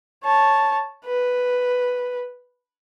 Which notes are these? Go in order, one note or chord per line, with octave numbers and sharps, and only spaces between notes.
C#5 A5
B4